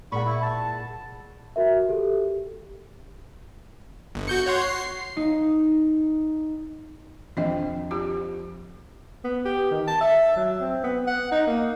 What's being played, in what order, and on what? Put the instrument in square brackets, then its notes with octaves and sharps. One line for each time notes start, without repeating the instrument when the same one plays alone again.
[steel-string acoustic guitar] A#2 G#4 F#5 [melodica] B5 C#6
[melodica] E4
A5
[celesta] F#4 A#4 E5
G4 A4
[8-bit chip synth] G1
F#4 G6 C#7
C#5 F#5 C6
C7
[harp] D#4
[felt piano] F2 [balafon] D4 D#5 G5
[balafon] F4 G4
[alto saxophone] B3
G4
D#3
A5
E5
F#3
C4
B3
F#5
D#4
A#3